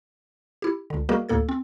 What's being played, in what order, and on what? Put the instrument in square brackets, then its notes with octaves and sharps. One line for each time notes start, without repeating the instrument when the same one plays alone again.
[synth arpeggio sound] E4 G4
C#2 D3
G3 A#3 F#4 G#4 A#4 D#5
D2 A2 A#3 A4 G#6
C4